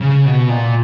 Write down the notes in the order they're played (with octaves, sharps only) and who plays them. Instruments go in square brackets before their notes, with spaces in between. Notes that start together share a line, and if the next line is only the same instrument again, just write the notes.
[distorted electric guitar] C#3
B2
A#2